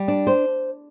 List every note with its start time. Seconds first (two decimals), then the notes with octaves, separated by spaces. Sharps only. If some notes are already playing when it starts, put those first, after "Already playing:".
Already playing: G3
0.08 D4
0.27 C5